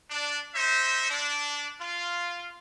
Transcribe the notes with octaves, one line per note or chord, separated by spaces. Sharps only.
D4
D#4 C5 E5
D4
F4